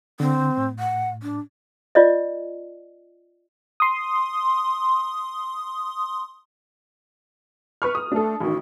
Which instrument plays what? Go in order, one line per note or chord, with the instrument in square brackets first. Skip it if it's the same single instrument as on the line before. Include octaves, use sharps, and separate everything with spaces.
[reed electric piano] D3 [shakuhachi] C4
[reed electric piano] A2
[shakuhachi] F#5
D4
[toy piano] F4 D5 D#5
[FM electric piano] C6 D#6
[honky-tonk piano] B4 C#6 F6
D#6
[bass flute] A3 [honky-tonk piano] D4 A4
[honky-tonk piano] A1 D#3 [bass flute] F#4